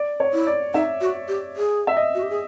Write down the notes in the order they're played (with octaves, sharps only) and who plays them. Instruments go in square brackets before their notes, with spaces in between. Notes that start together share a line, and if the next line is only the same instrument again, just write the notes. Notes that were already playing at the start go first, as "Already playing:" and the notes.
Already playing: [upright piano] D5
C#5
[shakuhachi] E4
[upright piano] D5
[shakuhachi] D#4 [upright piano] E5
[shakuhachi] F#4
G4
G#4
[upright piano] E5
D#5
[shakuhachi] F#4
G4
G#4